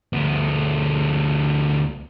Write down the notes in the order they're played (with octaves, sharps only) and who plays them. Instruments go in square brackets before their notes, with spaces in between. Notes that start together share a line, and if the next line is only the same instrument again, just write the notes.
[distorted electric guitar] D2 B3